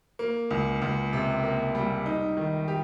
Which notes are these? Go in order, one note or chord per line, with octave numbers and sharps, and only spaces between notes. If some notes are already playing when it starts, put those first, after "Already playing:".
A#3
C#2
C#2
C3
A#3
G3
D#4
D#3
G4